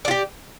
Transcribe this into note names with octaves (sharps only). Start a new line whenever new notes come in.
F4 G4 D5